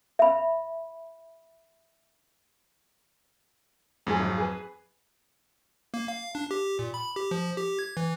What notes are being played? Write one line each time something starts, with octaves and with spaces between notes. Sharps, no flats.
E5 B5
F2 G#2 F#3 G#4
G#1
G#4 B4
A#3
F5
D4
G4
A#2
B5
G4
F3
G4
G#6
E3